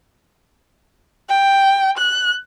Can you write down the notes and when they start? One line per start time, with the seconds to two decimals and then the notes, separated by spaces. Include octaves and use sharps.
1.29 G5
1.98 F#6